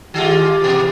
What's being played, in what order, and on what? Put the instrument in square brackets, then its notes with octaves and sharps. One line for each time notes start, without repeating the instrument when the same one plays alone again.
[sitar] D#3 G#3 F4 [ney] G4
[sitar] B2 E3